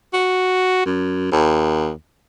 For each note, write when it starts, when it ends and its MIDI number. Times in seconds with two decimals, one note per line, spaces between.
0.13 0.84 66
0.85 1.30 42
1.32 1.91 39